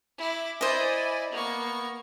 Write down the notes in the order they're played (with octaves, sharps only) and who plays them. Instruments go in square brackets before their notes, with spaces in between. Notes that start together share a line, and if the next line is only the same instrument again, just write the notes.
[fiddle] E4 D6
[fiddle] E4 [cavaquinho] C5 D#5 [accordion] D5 G#5
[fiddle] A#3 C#6 [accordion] B3